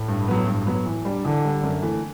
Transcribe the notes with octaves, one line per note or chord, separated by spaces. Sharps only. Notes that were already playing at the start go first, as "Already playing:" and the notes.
Already playing: A2
G2
F#3 B3
G2
F#3 B3
E3
G3 D4
D3 E3
G3 D4
F#2
E3 A3